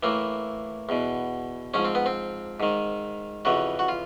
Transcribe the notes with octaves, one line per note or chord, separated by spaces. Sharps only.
A2 E3 A#3
E2 B2
G#2 F3 C#4
C4
B3
C4
G#2 D#3
F2 C#3 E3 F#4
F#4
F4